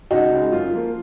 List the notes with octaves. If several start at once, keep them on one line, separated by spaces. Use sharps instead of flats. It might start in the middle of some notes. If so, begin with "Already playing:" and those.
C#2 D#4 F#4
C#3 G#3
F#2 F4
F3 A#3